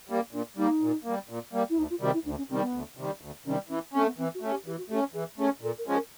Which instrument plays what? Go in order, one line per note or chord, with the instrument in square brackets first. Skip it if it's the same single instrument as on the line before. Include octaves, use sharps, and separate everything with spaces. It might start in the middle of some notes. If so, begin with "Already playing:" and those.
[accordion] G3 A#3
[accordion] A#2 [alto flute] D4
[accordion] G3 A#3 [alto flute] D#4
[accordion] A#2
G3 A#3
A#2
G3 A#3
[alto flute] E4
[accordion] D2 [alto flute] D#4
[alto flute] F4
[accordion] C3 D#3 G3 [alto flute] F#4
[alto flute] E4
[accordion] D2 [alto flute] D4
[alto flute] C#4
[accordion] C3 D#3 G3 [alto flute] C4
[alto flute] B3
[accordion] D2
C3 D#3 G3
D2
[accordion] C3 D#3 G3 [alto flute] C#4
[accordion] E3 [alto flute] C#4
[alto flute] C4 [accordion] C#4
[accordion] A3
[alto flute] B3
[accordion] E3 [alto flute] C4
[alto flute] F#4
[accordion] A3 C#4
[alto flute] G4
[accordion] E3 [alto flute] G4
[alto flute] F#4
[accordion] A3 [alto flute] G4
[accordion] C#4
[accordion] E3 [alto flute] G#4
[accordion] A3 C#4 [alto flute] G#4
[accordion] A#2 [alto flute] A4
[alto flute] A#4
[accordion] F3 G#3 C#4
[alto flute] A#4